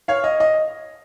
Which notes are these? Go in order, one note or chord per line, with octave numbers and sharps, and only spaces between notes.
C#5 F5
D#5
D#5